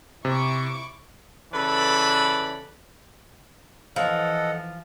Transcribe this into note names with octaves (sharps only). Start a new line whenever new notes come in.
C3 E4 C#6 D6
C#3 E3 A4 B4 D5 B5
E3 F3 A4 D#5 F#5